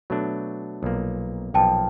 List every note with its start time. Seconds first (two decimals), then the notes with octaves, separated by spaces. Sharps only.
0.10 B2 F#3 A3 D4
0.83 B1 A#2 F3 A#3
1.54 B1 A#2 F3 A#3 G5 A5